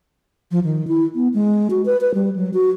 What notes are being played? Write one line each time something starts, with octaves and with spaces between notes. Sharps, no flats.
F3
D#3
E4
B3
G#3
F#4
B4
B4
G3
F#3
F#4